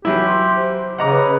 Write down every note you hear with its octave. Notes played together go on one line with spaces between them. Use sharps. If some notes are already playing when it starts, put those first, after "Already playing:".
E3 F#3 E4 G4
C6
C5
C#3 D#5 F#5 A#5 D6
B4